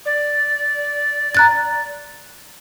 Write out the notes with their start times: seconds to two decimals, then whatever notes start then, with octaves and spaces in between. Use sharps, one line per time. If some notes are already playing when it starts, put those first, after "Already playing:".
0.05 D5
1.35 A#5 F#6 A6